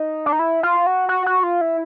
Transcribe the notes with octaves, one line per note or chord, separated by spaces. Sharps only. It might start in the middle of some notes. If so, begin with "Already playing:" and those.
Already playing: D#4
D4
D#4
E4
F4
F#4
F#4
F#4
F4
E4